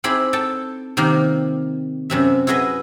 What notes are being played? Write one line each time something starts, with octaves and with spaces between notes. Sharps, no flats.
C4 D#4 E4 G#4 D5 B5
A4 G5 A5
C3 D#3 A#3 D#4 G4
F#2 C3 E5
E4 F#4 G#4 B4 D#5